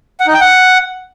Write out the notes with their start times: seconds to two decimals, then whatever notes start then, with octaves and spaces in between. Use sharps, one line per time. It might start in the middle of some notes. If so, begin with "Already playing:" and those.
0.20 F#5
0.27 D#4
0.34 G5
0.41 F#5